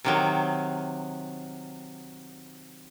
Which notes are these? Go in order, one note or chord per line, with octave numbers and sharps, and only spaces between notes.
C3 D#3 F#3